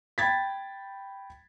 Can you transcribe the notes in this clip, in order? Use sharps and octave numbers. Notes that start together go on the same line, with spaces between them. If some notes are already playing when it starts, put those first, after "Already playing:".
G5 B5 G#6 A6 B6